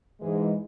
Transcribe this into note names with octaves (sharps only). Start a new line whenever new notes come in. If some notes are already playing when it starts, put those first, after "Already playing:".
G#2 E3 G#3